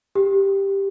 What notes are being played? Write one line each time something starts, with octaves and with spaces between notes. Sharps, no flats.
G4